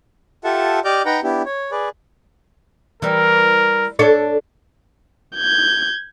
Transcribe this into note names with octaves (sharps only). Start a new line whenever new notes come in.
F4 G4 A4 E5 F#5 A5
G4 D5 D#5 D6 F6 G6
D#4 B4 F#5 G5 A#5
B3 D4 E4 G4
C#5
G#4 B4 D5
E3 G3 A#4
D4 A4 C#5
G6 G#6